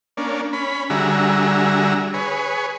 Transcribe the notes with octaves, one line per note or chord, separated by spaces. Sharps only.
A#3 C#4 D4
C#4 B5
D3 G3 F#4 G#4 E5 A#5
G#4 B4 C#5